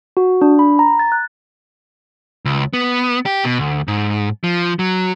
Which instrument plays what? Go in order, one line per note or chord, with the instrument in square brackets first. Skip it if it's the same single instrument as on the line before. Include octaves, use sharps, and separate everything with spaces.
[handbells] F#4
D4
B5
A#5
A6
F#6
[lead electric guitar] C#2
B3
G4
B2
D2
G#2
F3
F#3